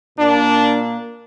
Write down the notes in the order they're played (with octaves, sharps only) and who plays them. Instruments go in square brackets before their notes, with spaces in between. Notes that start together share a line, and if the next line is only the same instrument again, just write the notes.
[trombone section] A#2 A#3 D4